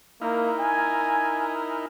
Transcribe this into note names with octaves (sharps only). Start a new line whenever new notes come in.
A#3 D#4 E4 A#4
G#5